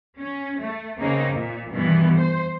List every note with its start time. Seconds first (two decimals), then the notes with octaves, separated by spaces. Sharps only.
0.19 C#4
0.59 A3
0.99 C#3 A#3 C4 D#4
1.34 A#2
1.70 G2 B2 D#3 E3 B3
2.18 C5